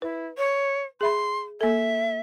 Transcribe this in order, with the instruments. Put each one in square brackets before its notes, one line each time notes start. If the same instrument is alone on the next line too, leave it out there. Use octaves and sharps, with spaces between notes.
[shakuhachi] E4 [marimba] B4
[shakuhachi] C#5
[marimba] G#4 E5 B5 [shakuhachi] C6
[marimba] A#3 A4 [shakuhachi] E5